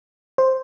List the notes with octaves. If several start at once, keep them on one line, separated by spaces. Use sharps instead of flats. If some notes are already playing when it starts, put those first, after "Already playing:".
C5